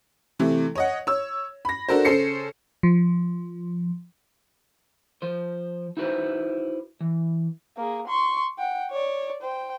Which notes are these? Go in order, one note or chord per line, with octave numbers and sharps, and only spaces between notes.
C3 E3 A3
C#5 D#5 F#5
C#5 E6
B5 A#6
D4 F#4 A4 A#4 C5
C#3 C#4 A4 C5 C7 C#7
F3
F3 C5
D#4 E4 F#4 G#4 B4 C5
E3
A#3 G#4
C6 C#6
F#5 G5
C#5 D5
C5 G5